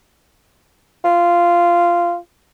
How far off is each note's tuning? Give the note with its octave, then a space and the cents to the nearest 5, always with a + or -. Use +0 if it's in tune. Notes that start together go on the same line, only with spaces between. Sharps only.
F4 -10